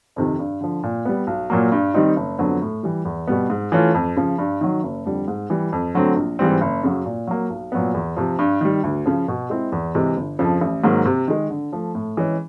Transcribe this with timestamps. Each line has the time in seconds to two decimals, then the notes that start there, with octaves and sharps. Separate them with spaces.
0.16 F2 C3 D#3
0.39 G2
0.61 D3 F3
0.83 A#2
1.05 G3 B3
1.27 B1
1.50 A#2 F#3 A#3
1.72 G2
1.94 D#3 G3 C4 D#4
2.16 F#1
2.39 F2 D3 F#3 B3
2.61 A2
2.83 E3 G3
3.05 E2
3.27 B2 G3 B3
3.50 G#2
3.72 E3 A3 C#4 F4
3.94 F2
4.17 C#3 F3
4.38 G2
4.61 D#3 F#3
4.83 F#1
5.05 F2 D3 G3
5.28 G#2
5.50 E3 G3
5.72 F2
5.94 D3 F#3 A3 C4
6.17 A#1
6.39 G#2 E3 G3 C4
6.61 F#1
6.83 F#2 C#3 F#3
7.06 A#2
7.27 F#3 A#3
7.50 B1
7.72 A#2 F#3 B3
7.94 E2
8.16 C3 F3
8.39 G2
8.61 D#3 G3
8.83 D2
9.06 C#3 F3
9.28 B2
9.50 G#3 C4 E4
9.72 E2
9.95 C3 E3 G#3
10.17 G1
10.39 F2 C#3 F3
10.61 A1
10.84 G#2 D#3 F#3 A#3
11.05 C3
11.28 D#3 G#3
11.50 D3
11.72 F3 A3
11.95 A2
12.17 E3 G#3 C#4